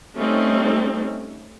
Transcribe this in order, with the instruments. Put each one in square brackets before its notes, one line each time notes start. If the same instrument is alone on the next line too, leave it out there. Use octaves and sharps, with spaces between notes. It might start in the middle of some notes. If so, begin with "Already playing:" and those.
[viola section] G3 A3 C4 C#4 D#4